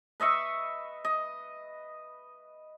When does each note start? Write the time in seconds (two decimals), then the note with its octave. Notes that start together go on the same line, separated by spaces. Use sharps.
0.20 B4 D#5 E5 C#6
1.05 D#5